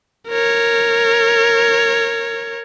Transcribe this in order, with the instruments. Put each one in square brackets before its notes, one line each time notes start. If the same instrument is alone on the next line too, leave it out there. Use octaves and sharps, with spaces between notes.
[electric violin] A#4 C#5